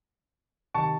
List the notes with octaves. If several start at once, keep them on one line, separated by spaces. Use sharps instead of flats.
C3 D#3 A5 C#6